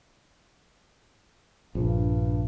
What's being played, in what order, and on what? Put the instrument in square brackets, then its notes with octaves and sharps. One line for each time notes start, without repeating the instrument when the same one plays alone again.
[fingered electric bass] A#1 [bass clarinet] G2